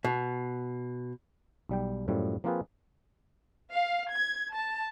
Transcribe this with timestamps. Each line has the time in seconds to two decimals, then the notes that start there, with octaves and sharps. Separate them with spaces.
0.04 B2
1.69 B1 G3 G5
2.08 F#2 A2 F3 G3
2.44 F3 A#3 C4 F4 G#4 B4
3.71 F5
4.12 G#6
4.53 A5